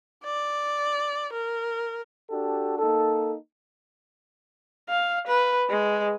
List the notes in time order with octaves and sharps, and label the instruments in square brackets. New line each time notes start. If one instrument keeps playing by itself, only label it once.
[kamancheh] D5
A#4
[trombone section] D4 F#4 G4 A4
A#3 D#4 A4
[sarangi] F5
B4
G#3